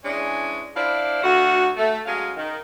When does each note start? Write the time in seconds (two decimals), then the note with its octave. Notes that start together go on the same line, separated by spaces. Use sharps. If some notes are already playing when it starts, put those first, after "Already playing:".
0.04 E3 G#3 C#4 D4
0.75 D4 E4 C5 D5 F5
1.23 D2 F#4
1.76 A3
2.06 F#3 G#3 C#4 F5
2.37 D#3